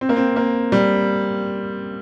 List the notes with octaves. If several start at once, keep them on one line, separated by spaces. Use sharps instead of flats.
C4
A#3
C4
A#3
G3